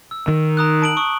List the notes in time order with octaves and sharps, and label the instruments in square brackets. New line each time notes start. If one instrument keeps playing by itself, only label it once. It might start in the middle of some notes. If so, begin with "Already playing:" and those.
[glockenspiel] E6
[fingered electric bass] D#3
[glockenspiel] A#5 D#6 F#6
A5 D7 F#7
C#6 D#6